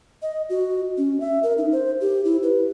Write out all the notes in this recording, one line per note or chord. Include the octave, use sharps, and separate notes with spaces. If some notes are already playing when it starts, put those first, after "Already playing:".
D#5
F#4
C#4
E5
A#4
D#4
C5
G4
E4
B4